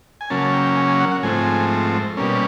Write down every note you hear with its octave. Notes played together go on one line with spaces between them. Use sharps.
G#5
C#3 F#3 A#3 C#4 A5
A5
G5
G5
G#5
G#5
F#5
F#5
G#2 F3 A3 C4 G#5
B2 G3 A#3 C#4